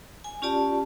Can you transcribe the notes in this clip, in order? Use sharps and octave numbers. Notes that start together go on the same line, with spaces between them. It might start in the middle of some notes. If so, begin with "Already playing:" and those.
G#5
C#4 F4 G4 D5 A5